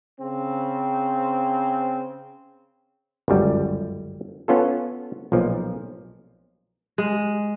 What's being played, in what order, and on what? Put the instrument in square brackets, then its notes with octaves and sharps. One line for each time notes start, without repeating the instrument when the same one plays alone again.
[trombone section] C#3 C4
[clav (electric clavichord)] G1 C#2 F#2 G3
B3 C#4 F4 A4
B1 A#2 F3
[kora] G#3